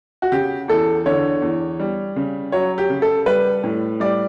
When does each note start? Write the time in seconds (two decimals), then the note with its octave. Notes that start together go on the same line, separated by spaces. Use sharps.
0.22 F#4
0.32 C#3 G4
0.68 E2 A4
1.06 D3 C#5
1.42 E2
1.79 G3
2.16 C#3
2.52 F#3 C#5
2.78 G4
2.90 C#3
3.02 A4
3.26 G3 B4
3.64 A2
4.00 G3 D5